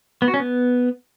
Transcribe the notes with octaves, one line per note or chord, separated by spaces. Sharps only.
B3
F#4
C#4
B3